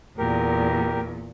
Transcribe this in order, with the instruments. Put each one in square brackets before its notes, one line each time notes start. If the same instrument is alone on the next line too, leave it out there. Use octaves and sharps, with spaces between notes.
[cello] E2 A#2 [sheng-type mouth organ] G4 A#4